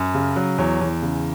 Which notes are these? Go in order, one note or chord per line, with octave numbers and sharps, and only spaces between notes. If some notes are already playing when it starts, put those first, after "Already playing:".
Already playing: F#2
C#3
F#3
E2 C#5
E2
C#3